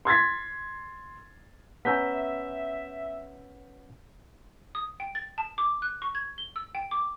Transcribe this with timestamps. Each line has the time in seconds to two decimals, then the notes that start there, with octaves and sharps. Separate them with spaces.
0.05 C6 G#6 A6 B6
1.85 B3 C#4 E5 A#5 E6 G6 B6
4.75 D#6
5.00 G5
5.15 A6
5.38 A5
5.58 D6
5.82 F#6
6.02 C#6
6.15 G#6
6.38 G7
6.56 E6
6.75 G5
6.91 D6